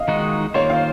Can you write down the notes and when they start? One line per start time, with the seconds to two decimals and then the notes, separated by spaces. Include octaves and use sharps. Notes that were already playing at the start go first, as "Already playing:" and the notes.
Already playing: D#5 F5
0.08 D#3 G#3 D#4 F#4
0.54 D#3 A#3 F4 C5 C#5
0.70 F5